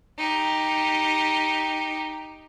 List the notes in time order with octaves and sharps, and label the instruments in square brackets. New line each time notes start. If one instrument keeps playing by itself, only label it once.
[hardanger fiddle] D#4 G4